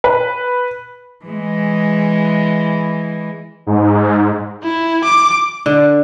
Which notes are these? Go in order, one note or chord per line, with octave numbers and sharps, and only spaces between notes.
B4
E3 G#3
G#2
E4
D6
D3